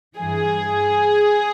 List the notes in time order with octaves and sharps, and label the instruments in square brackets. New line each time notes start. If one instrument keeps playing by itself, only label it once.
[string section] G2 E3 G#4